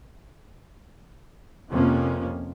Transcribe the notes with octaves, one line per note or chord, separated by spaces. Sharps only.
F2 C3 F3 A#3 C#4